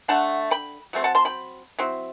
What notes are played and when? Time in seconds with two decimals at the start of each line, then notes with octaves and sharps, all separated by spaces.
0.08 D3 A3 D4 F#5 A5
0.51 G5 B5
0.93 F#3 A3 C4
1.04 F#5 A5
1.15 A5 C6
1.25 G5 B5
1.79 F#3 C4 E4